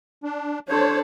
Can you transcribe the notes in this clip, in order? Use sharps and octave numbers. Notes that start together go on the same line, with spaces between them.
D4
D4 A4 C5 C#5